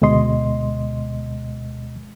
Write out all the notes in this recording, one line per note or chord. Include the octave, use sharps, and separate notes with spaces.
D2 B2 G#3 D#5 C6